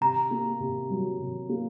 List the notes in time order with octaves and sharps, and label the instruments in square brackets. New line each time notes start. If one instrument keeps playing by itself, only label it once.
[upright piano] C3 [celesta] A#5
[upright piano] A#3
C3
F#3
C3
A#3